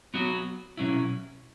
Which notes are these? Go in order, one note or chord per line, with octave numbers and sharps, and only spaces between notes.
F#3 B3 F#4
B2 F#3 C#4 E4